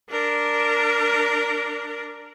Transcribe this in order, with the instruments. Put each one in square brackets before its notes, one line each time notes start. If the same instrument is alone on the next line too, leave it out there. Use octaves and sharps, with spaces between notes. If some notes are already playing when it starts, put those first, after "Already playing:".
[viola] D4 A#4